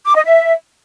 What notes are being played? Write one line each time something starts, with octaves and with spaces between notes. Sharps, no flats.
D6
D#5
E5